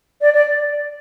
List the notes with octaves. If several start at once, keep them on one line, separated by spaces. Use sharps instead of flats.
D5
D5